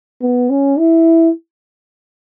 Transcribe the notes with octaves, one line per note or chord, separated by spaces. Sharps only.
B3
C#4
E4